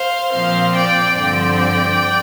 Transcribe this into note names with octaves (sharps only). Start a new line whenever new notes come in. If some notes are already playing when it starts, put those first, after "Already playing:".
Already playing: C5 F5
A#2 F3 C4 C5 F5
D5 G5
G2 D3 F3 C4 D5 G5